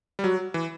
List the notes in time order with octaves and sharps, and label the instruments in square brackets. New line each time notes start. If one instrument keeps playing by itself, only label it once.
[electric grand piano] G3
[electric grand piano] F#3 [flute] F#4
[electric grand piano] E3